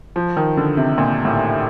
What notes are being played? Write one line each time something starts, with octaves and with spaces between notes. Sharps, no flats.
F3
D#3
D3
C3
A#2
A2